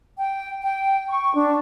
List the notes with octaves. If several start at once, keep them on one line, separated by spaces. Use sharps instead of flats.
G5
G5
C#6
D4